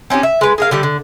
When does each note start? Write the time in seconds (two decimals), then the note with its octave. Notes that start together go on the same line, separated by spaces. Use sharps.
0.10 C4 C#4 D#4 G4
0.23 E5
0.41 G#3 B4
0.58 G#4 A#4 F5
0.71 D3 G3 G4
0.83 D3